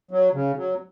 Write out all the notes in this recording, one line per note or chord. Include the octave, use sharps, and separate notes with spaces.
F#3
C#3
F#3